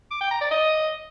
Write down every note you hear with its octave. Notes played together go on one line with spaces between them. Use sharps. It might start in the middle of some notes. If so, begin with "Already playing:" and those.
D6
G5
A#5
D5
D#5